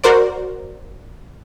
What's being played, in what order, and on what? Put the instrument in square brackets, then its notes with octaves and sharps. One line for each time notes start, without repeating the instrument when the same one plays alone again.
[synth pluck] F#4 A#4 C5 D5